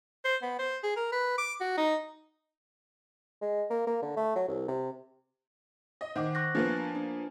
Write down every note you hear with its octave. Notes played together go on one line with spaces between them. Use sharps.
C5
B3
C5
G#4
A#4
B4
D6
F#4
D#4
G#3
A#3
A#3
D3
A3
F#3
C2
C3
D#5
D#3 C5 F#5 D6
C#6 F#6 A#6
F3 A#3 B3 D4
D4